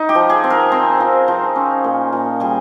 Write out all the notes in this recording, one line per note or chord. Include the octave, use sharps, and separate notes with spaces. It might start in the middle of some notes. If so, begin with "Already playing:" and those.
Already playing: D#4
G4
F3
G#4
C4
A#4
C4
F3
F3
C#4
A#2
A#2
G3 G#4